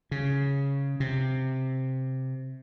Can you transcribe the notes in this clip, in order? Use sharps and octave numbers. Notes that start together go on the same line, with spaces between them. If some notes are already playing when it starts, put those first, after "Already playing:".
C#3
C3